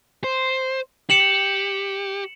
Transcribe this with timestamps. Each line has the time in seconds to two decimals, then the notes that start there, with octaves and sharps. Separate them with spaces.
0.24 C5
1.10 G4 C#7 E7 F#7